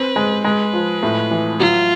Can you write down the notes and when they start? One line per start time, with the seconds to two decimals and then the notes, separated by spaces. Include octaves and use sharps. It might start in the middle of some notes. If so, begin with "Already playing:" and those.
Already playing: C4 B4
0.16 G#3
0.44 G#3 B4
0.73 F3
1.03 A2
1.31 E3
1.60 F#3 F4